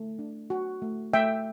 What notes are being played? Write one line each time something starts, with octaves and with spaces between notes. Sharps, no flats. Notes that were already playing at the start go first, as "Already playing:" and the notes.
Already playing: A3
D4
F#4
A3
A3 E5 G5